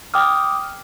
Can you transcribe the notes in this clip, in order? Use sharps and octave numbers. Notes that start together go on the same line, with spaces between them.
G5 D6 D#6 F6